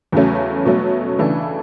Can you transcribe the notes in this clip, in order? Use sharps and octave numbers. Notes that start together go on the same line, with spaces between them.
E2 C#3 F#3 A3 C#4
B2 F#3 A3 C#4
C#3 E3 A3 D4 A4